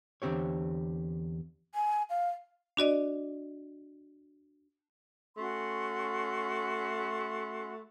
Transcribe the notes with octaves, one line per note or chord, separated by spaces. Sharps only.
E2 D3 C4 G4 C#5
G#5
F5
D4 F#4 D5 D#5
A3 C#4 F#4 C6